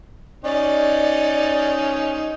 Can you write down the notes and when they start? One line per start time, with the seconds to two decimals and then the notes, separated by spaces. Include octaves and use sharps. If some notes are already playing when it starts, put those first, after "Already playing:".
0.44 C#4 D#4 D5